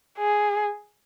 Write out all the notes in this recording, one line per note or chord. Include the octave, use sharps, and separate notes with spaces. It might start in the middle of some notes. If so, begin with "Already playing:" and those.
G#4